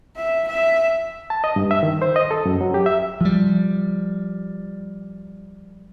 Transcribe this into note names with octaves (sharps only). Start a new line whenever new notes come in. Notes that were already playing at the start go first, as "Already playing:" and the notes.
E5
E5
A5
D#5
G2
E5
D#3
C5
D#5
A4
F#2
F#3
G4
E5
F3 G3